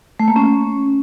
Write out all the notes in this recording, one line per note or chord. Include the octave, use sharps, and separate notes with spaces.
A3
A#3
C#4